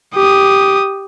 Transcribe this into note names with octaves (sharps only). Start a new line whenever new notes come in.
G4 D#6